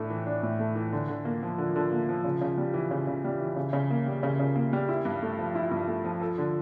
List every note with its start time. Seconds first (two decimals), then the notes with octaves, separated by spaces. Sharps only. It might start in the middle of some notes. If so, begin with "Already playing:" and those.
Already playing: A2 A3 D4
0.10 E3
0.26 D4
0.43 A2
0.59 A3
0.75 E3
0.92 D3
1.08 D3
1.25 A#3
1.43 F3
1.58 D3
1.76 D3
1.92 A#3
2.09 F3
2.24 C#3
2.41 C#3
2.58 G3
2.74 E3
2.91 C#3
3.07 C#3
3.24 G3
3.40 E3
3.56 C#3
3.73 C#3
3.90 A#3
4.06 G3
4.23 C#3
4.40 C#3
4.56 A#3
4.73 G3
4.89 E4
5.05 G2
5.22 A3
5.39 F3
5.55 E4
5.71 G2
5.88 A3
6.05 F3
6.21 A4
6.38 D3